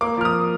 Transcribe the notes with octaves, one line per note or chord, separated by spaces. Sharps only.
A#3 D6
F3 F6
D#6